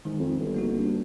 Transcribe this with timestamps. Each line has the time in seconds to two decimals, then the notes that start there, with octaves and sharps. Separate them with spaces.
0.05 G#2 D#3
0.19 F2
0.39 G1
0.54 A#3 D#4 F#4
0.78 G2